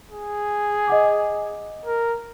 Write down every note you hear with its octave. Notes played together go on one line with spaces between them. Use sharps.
G#4
D#5 F#5 D6
A#4